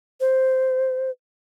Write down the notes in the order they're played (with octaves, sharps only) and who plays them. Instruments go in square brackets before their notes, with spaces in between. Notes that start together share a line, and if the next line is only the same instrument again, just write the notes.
[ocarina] C5